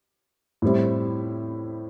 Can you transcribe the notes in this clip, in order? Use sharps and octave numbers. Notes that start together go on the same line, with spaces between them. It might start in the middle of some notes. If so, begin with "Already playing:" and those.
A2 G3 C4 E4